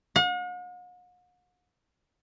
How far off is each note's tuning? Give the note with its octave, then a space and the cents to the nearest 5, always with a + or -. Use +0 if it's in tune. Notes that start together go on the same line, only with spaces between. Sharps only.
F#5 -45